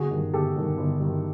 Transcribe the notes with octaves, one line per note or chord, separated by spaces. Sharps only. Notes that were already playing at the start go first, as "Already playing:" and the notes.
Already playing: G1 F#4 G#4
G2 D#3
G1 G4 A4
G2 D#3
G1
G2 D#3